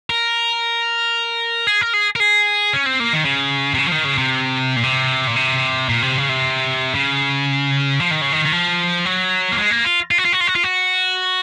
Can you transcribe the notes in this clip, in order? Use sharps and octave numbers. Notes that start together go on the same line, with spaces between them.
A#4
G#4
A#4
G#4
A#4
G#4
C#4
C4
A#3
D#3
C#3
C3
C#3
F3
D#3
C#3
C3
A#2
C3
A#2
C3
A#2
C3
C#3
C3
C#3
F3
D#3
C#3
D#3
D#3
F3
F#3
A#3
G#3
A#3
F4
F4
F#4
F4
F#4
F4
F#4
F4
F#4